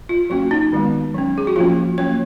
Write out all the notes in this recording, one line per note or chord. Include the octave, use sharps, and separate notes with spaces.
F4
F#3 A#3 C#4 F#4
D#4
D#3 G#3 B3
F#3 C#4
G#4
F#4
F3 A#3 C#4 F4
F#3 A#3 C#4 C#5